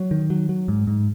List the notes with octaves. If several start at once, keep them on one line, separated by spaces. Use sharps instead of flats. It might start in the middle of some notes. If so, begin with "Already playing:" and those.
Already playing: F#3
D#3
F#3
F#3
G#2
G#2